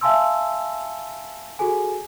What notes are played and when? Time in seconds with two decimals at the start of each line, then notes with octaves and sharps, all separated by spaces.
0.01 E5 F5 G#5 A5 C6 E6
1.59 F#4 G#4 A4 G#5